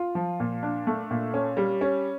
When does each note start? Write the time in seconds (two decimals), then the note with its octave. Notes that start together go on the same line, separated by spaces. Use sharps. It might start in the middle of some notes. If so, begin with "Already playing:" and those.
Already playing: F4
0.15 F3
0.40 A#2
0.63 D4
0.87 A3
1.11 A#2
1.34 C#4
1.57 G3
1.81 C#4